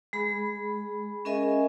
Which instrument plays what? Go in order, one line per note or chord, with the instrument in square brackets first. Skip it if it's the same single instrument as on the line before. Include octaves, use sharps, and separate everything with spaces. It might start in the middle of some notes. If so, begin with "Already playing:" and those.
[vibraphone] G#3 G#4 B5
C#4 G#4 A#4 D#5 E5 G#5